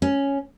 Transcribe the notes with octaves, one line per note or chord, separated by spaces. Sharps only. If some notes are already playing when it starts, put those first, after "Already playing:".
C#4